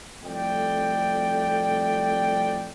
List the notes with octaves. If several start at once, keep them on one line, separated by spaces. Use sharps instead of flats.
C2 F2 A3 D5 G5